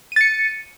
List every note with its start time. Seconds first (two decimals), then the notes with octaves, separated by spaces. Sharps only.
0.12 D#7
0.16 A6
0.21 C#7